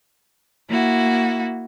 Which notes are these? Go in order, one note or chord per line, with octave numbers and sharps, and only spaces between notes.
A#3 E4 F#4